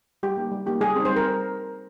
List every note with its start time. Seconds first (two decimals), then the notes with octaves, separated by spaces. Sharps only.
0.23 G3 G4
0.37 A#3 D#4 G4
0.51 G3
0.66 A#3 D#4 G4
0.81 G3 G#4
0.96 C4 D#4
1.05 G3 C5
1.16 A#4